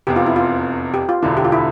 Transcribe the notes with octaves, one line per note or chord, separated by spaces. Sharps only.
F1 E2 C3 G4
F4
E4
F4
G4
F4
E1 D2 D3 E4
G4
F4
E4